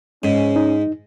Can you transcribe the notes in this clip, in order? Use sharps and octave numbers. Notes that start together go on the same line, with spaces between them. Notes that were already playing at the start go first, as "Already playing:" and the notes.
G#2 C#4
D#4